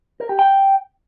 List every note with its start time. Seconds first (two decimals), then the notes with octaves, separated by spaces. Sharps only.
0.20 A#4
0.29 G4
0.39 G5